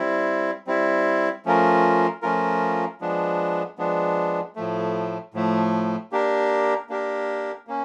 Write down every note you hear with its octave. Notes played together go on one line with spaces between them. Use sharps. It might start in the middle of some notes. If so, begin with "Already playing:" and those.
Already playing: G3 C4 E4
G3 C4 E4
F3 A3 C#4 F4 A#4
F3 A3 C#4 F4 A#4
F3 G#3 B3 D4
F3 G#3 B3 D4
A2 F3 A3
A2 F3 A3
A#3 D4 G4 A#4
A#3 D4 G4 A#4
A#3 C#4